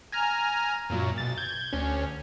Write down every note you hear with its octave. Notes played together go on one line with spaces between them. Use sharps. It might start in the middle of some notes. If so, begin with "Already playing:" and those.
G#5 A#5 F6
F#2 A#2 F#3
B1 A6
G6 G#6
D2 C#4